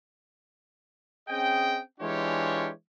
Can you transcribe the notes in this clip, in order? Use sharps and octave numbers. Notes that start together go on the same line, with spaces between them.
C4 C#4 G#4 D#5 G5
E3 G#3 D4 F4 G4 C#5